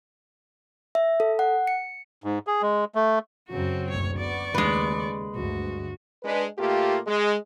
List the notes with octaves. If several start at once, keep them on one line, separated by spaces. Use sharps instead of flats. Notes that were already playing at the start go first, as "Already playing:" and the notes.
E5
A4
F#5
C#7
G#2
G#4
G#3
A3
F#2 C#3 F#3 C4 F#4
F#1 D2 B2 C#5
B3 D5 C#6
D#2 C#3 G#3 A3 B4
D2 G2 F#4
G#3 D4 B4
A#2 A3 A#3 F4 G4
G#3